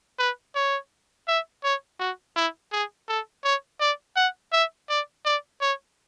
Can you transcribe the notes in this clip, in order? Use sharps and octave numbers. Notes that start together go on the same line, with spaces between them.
B4
C#5
E5
C#5
F#4
E4
G#4
A4
C#5
D5
F#5
E5
D5
D5
C#5